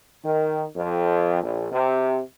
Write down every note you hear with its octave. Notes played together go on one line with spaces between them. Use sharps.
D#3
F2
A#1
C3